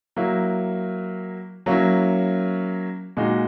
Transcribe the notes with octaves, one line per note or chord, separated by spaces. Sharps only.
F#3 A#3 E4
F#3 A#3 C#4 E4
A#2 G#3 D#4 F#4